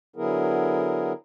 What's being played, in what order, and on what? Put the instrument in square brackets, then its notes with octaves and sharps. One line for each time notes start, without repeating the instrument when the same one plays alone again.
[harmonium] D3 F#3 B3 E4 G#4 A#4